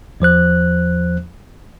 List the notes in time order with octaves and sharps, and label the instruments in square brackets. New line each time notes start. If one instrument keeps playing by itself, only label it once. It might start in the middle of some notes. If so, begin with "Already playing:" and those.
[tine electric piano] E2 F3 C5 F#6